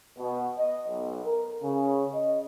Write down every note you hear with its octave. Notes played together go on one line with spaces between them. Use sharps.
B2
D#5
B1
A#4
C#3
D#5